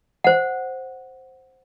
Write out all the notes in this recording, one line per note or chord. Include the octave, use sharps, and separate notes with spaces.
C5 F#5